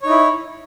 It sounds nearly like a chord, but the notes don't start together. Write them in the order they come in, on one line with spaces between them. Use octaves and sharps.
C#5 D#4 E4